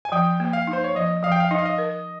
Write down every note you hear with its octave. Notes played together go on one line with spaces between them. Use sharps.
G#5
F3 G5
A#3
F5
D#4
C5
C#5
F3 D#5
F3 F5
G5
F5
D#4 D#5
F5
D#5
A#4